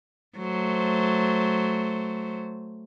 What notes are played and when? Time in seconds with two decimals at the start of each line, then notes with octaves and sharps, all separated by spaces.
0.37 F#3 A3 C5